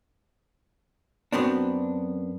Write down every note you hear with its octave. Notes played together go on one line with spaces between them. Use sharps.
F#2 B3 C4 D4